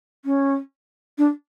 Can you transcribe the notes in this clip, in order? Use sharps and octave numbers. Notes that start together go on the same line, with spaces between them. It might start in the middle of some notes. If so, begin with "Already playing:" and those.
C#4
D4